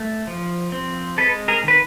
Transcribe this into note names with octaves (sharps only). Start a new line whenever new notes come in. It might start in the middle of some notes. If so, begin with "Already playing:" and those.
Already playing: A3
F3
C4
G#3 A4 B4
G#4 A#4
D#3 B4